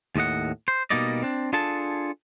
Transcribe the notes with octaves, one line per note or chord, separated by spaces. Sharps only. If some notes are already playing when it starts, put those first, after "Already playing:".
D#2 A2 D#5 F#5
C5
B2 G3 A#3 D#4 D5 D#5
C4 D4
D4 F4 G#4 A4 A5